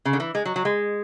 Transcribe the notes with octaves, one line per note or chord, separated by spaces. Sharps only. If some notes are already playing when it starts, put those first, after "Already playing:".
C#3
D3
E3
G#3
F#3
F#3
G#3